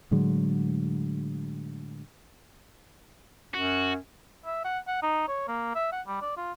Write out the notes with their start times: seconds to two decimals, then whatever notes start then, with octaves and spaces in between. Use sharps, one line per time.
0.11 A2 D3 F#3 G#3
3.54 F#2 F#4
4.46 E5
4.65 F#5
4.87 F#5
5.03 D#4
5.28 C#5
5.48 A#3
5.75 E5
5.92 F#5
6.07 G3
6.22 D5
6.37 F4